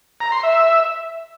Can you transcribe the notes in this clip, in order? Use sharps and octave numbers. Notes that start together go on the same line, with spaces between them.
A#5
C6
E5